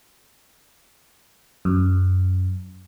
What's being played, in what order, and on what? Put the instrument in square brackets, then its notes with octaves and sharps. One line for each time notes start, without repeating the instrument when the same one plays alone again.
[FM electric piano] F#2